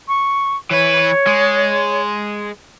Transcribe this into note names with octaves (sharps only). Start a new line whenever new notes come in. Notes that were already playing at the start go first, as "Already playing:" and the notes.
C#6
E3 B4 C#5
G#3